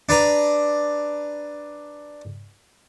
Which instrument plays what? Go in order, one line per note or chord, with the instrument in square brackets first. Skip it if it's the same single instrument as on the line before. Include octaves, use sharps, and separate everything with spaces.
[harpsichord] D4 B4 A#5